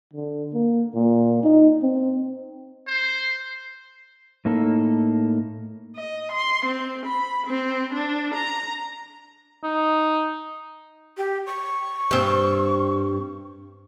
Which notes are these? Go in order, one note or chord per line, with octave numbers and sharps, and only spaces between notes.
D3
A#3
A#2
D#4
C4
C5
A2 A#3 D#4 A4
D#5
C6
C4
B5
C4
D4
A#5
D#4
G4
C#6
G2 C4